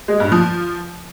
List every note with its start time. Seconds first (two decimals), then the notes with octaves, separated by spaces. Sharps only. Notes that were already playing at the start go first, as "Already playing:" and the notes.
0.08 G#3
0.20 G2
0.32 F3